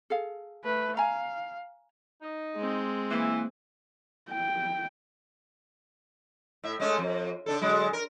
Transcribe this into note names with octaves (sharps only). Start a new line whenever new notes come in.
G#4 A4 F5
A3 B4
F5 G#5 A#5
D#4
G#3 C4
E3 A#3
G5
A2 E5
G#3 A3 C#4
F2
C#3 D4 A4
D3 F#3 G#3
A#4